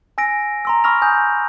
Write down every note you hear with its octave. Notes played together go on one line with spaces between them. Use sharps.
G#5 E6 A#6 D7
A#5 C6 E6
B5 C#6 E6 F6 A#6 F7
G#5 D#6 G6